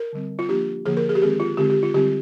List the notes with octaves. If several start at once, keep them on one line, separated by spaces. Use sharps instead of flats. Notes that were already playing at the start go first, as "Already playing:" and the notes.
Already playing: A#4
D3 G3 C4
F4
F3 A#3 D4 G4
D3 F3 A#3 G#4
A#4
G#4
G4
D#3 G#3 C4 G#4
F4
D3 G#3 C4 G4
G4
F4
D3 G3 C4 G4